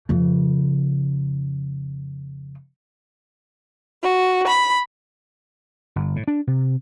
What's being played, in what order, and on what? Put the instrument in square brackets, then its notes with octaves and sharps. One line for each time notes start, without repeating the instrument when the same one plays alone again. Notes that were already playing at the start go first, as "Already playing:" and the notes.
[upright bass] F2 C#3
[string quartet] F#4
B5
[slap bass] G1
A2
D4
C3